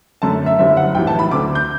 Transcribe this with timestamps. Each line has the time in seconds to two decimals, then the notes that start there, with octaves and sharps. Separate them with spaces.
0.22 F#2 D3 A3 A5
0.46 E5
0.59 F#1 F#2 D3 G3 E5
0.77 F#5
0.95 B1 A2 E3 G3 G5
1.07 A5
1.19 B5
1.31 D2 D3 A3 D6
1.55 G6